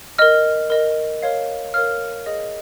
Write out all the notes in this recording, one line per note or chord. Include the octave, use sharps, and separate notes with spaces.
A#4 D#5 F6
A#4 D#5
A#4 C#5 F5
A#4 C#5 F5 F6
G#4 D#5